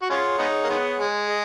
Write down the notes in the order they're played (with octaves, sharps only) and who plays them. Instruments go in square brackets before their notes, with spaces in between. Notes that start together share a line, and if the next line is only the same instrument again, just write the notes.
[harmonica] F#4
[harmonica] G#3 C#4 F4 [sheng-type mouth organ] G#4 C#5 F#5
[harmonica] G#3 B3 D#4
A#3
D#3 G#3 B3
G#3
[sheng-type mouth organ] G#4 D#5